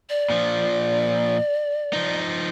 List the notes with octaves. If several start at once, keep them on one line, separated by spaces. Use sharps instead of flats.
D5
A#2 F3
F3 D#4